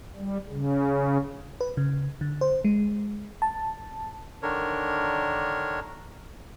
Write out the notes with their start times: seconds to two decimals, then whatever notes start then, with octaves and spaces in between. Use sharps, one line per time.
0.16 G3
0.49 C#3
1.61 B4
1.77 C#3
2.21 D3
2.41 C5
2.64 G#3
3.42 A5
4.43 D3 D#3 D4 A#4 C#5